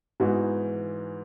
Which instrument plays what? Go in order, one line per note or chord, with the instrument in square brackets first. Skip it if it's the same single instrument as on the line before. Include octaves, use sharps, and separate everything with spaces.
[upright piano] G#2 E3 B3 D#4 F#4